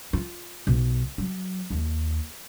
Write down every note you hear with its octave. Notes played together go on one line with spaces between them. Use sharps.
F4
B1
F#3
D#2